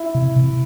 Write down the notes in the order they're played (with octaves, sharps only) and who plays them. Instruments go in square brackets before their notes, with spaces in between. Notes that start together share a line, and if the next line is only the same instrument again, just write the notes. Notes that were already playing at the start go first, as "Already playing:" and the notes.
Already playing: [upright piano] E4
[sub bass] C3
C3